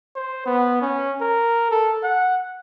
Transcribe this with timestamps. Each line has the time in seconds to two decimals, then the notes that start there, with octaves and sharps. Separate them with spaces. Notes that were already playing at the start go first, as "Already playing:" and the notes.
0.15 C5
0.46 B3
0.82 C#4
1.21 A#4
1.71 A4
2.03 F#5